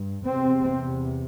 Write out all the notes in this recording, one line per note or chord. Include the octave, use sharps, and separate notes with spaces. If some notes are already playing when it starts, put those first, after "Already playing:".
Already playing: G2
E2 C3 C4